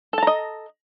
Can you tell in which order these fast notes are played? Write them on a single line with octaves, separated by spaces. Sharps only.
A4 A5 A#5 D#5